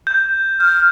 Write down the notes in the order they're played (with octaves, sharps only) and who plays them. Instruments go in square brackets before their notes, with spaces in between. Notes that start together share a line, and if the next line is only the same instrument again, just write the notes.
[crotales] G6
[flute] F6 [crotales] G6